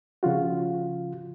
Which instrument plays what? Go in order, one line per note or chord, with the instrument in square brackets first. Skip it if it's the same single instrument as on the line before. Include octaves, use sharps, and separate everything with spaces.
[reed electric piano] C#3 F3 F4 F#4